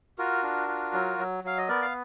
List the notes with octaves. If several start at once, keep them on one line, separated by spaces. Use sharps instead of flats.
F4 F#4 A#4
D4
F4
F#3
F#3
F#3 F5
D#5
B3 A#4 D5
F5